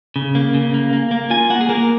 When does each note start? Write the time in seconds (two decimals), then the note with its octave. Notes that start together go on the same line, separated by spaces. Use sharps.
0.16 C#3
0.35 A#3
0.54 C#3
0.74 A#3
0.93 A#3
1.11 A#3
1.30 F4 G#5
1.50 A#3 F#5
1.61 G#4
1.69 A#3 A#4